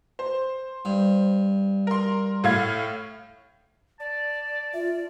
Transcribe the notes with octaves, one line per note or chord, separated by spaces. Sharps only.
C5
G2
A#4 C6
A2 F5 G#6
D5 A5
F4 E5